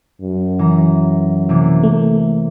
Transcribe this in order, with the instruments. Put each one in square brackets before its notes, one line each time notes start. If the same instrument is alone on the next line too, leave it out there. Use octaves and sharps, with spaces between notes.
[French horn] F#2
[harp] E3 A#5
C3 E3 A#3
[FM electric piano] A3